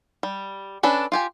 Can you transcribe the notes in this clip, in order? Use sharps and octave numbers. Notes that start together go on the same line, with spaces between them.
G3
C#4 D4 A4 B4
F4 G4 G#5